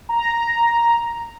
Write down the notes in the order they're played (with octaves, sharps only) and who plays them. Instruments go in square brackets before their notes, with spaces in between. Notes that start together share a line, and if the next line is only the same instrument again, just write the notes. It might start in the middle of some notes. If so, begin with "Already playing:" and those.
[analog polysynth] A#5